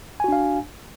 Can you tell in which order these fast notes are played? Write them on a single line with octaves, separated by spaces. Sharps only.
G#5 F#4 D4 F5